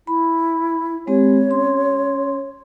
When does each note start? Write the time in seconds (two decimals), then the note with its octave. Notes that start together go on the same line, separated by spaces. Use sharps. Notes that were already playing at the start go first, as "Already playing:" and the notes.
0.07 E4 B5
1.07 G#3 C4 G4 C#5
1.50 C#4 C6